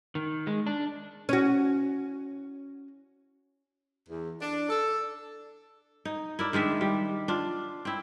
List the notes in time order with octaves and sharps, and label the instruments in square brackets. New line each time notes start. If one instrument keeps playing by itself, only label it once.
[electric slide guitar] D#3
G#3
D4
[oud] C#4 F#4
[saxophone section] E2
D4
A4
[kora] D#4
E4 A#4 D5
D#3 G#3 D4 E5
G3
D4 F4
C4 E4